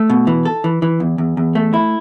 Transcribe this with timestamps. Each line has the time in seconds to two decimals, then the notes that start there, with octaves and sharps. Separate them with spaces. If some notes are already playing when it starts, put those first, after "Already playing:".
Already playing: A3
0.10 B2
0.27 E3
0.45 A4
0.64 E3
0.82 E3
1.00 E2
1.18 E2
1.37 E2
1.55 A3
1.74 E4